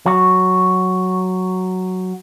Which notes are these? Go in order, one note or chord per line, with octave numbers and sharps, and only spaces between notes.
F#3 F#4